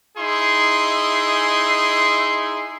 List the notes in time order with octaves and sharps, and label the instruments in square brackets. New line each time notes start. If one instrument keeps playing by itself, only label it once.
[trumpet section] D#4 E4 G#4 C6